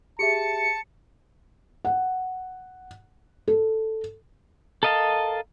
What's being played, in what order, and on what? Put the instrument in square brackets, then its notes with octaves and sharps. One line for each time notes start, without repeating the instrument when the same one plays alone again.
[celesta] G4 G#4 E5 [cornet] A5 [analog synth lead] C#7
[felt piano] F#5
A4
[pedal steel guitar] A4 A#4 D#5 F5 A5